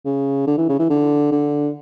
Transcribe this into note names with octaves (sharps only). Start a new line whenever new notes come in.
C#3
D3
E3
C#3
E3
D3
D3